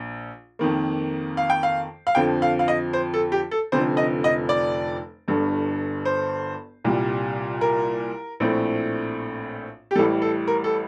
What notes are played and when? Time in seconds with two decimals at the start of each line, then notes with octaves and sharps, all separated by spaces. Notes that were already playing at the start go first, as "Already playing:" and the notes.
Already playing: A#1
0.59 F2 D#3 A#3
1.37 F5
1.50 G5
1.63 F5
2.07 F5
2.15 F2 D3 F3 G5
2.42 F5
2.59 F5
2.68 D#5
2.93 C5
3.14 A4
3.32 G4
3.51 A4
3.72 F1 F2 D3 F3 C5
3.97 D#5
4.24 D#5
4.49 D5
5.28 G1 G2 D3
6.05 C5
6.84 C2 A#2 G3
7.61 A#4
8.40 A#1 A2 A3 C4
9.91 G4
9.95 A1 A2 G3 A4
10.22 A4
10.48 A#4
10.64 A4